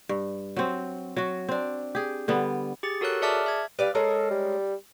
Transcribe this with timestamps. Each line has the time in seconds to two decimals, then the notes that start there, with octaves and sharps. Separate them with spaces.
0.09 G2
0.57 F#3 C4
1.16 F#3 F#4
1.49 C4 D4
1.95 G4 G#4
2.28 D3 G3 B3
2.83 G4 G#4 A6
3.01 F#4 A4 A#4 C#5 F#6
3.22 G#4 D5 E5 A5 D6 F6
3.46 E5 G#6
3.79 G3 B4 D5 F5
3.95 G#3 C#4 A4 A#4
4.30 G3